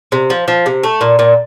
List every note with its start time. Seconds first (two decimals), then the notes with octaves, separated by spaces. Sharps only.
0.12 C3
0.30 F3
0.48 F3
0.66 C3
0.83 A3
1.01 A#2
1.19 A#2